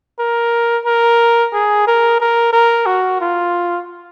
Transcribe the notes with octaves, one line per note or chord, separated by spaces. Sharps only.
A#4
A#4
G#4
A#4
A#4
A#4
F#4
F4